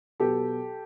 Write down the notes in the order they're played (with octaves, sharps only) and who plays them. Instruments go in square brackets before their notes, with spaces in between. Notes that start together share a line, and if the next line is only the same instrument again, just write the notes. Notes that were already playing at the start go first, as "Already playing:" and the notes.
[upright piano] B2 F#3 B3 G4 A4